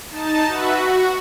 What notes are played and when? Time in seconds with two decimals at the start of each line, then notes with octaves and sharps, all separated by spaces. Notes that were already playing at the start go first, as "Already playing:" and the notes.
0.11 D#4 A5
0.47 F#4 B4 E5
0.77 F#4